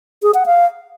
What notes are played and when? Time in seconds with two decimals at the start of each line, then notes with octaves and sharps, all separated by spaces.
0.22 G#4
0.34 F#5
0.46 F5